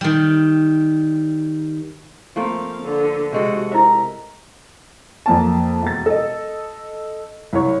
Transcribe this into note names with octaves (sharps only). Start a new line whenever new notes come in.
D#3 G3
F3 A3 A#3 C4 F5
D3
C3 G#3 F#4 A4
E4 A#4 C5 E5
F2 A#3 A5
E1 A6
A4 D#5
C2 C#5